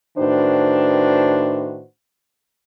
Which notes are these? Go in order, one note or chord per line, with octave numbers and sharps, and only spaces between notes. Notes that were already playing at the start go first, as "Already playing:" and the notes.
A2 D#3 D4 F#4 B4 C5